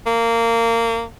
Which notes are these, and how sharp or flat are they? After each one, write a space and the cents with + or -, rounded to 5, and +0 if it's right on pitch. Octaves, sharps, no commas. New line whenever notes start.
A#3 -20